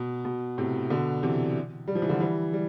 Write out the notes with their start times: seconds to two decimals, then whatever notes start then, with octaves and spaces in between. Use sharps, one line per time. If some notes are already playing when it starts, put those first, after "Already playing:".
Already playing: B2
0.25 B2
0.58 A2 C3
0.90 B2 D3
1.23 C3 E3
1.88 G3
1.95 F3
2.02 E3
2.09 D3 F3
2.20 E3 G3
2.53 G3